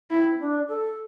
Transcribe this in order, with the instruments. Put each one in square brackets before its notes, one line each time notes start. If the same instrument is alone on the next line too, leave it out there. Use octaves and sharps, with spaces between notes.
[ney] C4 [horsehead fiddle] E4
[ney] D4
A4